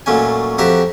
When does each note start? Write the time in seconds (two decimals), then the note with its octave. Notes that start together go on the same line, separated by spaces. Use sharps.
0.06 A#2 F#3 A3 C#4 G#5
0.58 F2 F#4 G4 E5 A#5